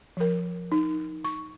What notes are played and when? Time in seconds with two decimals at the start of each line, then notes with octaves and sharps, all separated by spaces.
0.17 F3 A#4
0.72 D#4
1.24 C#6